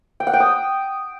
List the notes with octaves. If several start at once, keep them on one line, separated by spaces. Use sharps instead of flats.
G5
F#5
G5
D#6